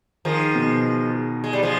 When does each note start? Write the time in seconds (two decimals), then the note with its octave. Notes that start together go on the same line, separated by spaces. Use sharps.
0.25 D#3 F3 G#3
0.55 B2
1.44 G#3
1.53 G3
1.63 F3 G#3